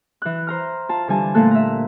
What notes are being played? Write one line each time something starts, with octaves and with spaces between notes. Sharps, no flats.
E3 F#6
C5 A#5 F6
F4 A5
D3 E3 G3 G#5 A5
A#2 A3 A#3 A4 F#6
E5 A#5